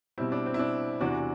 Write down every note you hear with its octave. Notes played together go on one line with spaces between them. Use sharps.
B2 G3 C4 E4
D4
C4
E4
D4
E2 C3 E3 D4 F#4